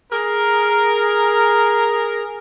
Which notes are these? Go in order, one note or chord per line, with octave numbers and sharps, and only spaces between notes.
G#4 A#4